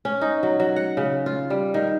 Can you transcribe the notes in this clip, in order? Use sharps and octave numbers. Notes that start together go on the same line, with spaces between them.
C#4
D#4
F#3
F#3
F#5
C#3
F4
G3
D#3